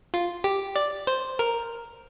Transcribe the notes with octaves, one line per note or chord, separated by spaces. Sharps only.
F4
G4
D5
C5
A#4